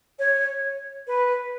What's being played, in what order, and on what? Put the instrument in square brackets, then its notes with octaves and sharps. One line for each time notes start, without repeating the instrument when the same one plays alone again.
[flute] C#5
B4